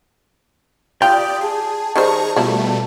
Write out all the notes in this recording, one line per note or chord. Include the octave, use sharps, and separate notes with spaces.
F4 G4 D5 G5 D#6
G#4 A5
D#3 G3 G#4 C5 A#5 C#6
B2 F3 G3 A3 E4